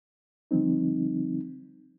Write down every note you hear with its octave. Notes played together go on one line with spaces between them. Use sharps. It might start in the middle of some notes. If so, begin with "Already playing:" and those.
D3 F3 G3 C4 D#4